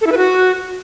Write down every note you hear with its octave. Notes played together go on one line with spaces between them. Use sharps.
A4
E4
B4
F#4